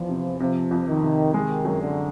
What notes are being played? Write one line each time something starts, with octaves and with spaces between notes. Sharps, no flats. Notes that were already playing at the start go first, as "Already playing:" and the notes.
Already playing: E2 F3
C3
C3 F3
F2
D#3
C3
D#3 G#3
F#2
D3